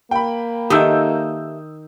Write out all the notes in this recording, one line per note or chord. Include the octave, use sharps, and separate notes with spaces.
A#3 G5 B5
D#3 G4 A4 E5 D#6 E6 G6